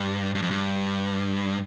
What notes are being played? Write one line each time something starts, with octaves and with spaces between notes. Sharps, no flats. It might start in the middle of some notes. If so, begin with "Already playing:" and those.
Already playing: G2
G2
F2
G2